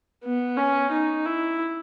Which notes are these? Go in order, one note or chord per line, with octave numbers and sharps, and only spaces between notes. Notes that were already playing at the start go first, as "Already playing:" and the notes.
B3
C#4
D#4
E4